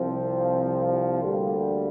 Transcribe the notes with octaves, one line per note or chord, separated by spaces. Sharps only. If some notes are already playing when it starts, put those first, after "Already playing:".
Already playing: C2 C3 F3 C4
D2 D3 G3 A#3